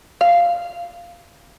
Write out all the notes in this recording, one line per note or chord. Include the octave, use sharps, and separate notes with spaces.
F5